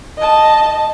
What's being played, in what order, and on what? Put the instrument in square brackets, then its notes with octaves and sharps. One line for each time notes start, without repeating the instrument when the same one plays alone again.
[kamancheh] D#5 A5